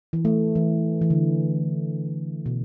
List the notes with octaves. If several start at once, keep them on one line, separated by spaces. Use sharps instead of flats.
E3
A3
E3
E3
D3
B2